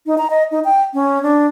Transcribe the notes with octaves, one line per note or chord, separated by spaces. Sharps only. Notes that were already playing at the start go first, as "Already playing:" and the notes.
D#4
A#5
D#5
D#4
G5
C#4
D4